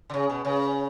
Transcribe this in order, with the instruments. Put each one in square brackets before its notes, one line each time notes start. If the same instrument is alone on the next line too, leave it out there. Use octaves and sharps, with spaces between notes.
[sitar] D3
C#3
B2
C#3